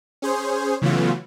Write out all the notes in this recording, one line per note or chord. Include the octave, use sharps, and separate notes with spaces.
C#4 G#4 C5
C#3 E3 F#3 A3 B3 F4